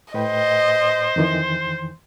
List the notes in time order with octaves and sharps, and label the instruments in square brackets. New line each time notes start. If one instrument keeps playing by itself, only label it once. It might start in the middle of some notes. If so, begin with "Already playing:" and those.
[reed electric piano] A2 B4 G5 [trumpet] C5 [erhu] D#5
[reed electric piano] F2 D#3 E3